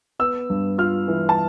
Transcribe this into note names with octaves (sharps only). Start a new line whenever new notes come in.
B3 E6
G2
F4 F6
E3
A5